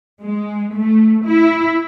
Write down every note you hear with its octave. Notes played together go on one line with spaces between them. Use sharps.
G#3
A3
E4